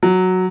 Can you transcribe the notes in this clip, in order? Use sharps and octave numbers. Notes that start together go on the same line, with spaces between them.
F#3